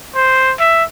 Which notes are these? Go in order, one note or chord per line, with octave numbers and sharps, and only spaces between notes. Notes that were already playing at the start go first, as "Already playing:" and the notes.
C5
E5